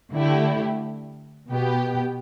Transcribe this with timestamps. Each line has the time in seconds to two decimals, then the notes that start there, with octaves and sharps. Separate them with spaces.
0.13 D3 A3 E4 G4
1.49 B2 B3 G4